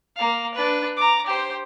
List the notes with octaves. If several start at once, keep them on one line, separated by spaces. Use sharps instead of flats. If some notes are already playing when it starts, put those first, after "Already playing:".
A#3 F5
D4 B4
A#5 D6
G4 C5